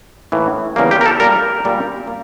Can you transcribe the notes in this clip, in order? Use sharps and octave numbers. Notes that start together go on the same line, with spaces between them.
A2 E3 A#3
E2 C#3 G3 A#3
G4
A#4
A4
A#2 G3 A#3 A#4
A#2 G3 A#3
A#3